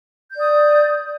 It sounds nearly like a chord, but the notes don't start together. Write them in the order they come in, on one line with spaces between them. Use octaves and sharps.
G6 D5 D#6